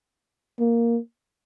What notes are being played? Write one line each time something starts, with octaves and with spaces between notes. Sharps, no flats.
A#3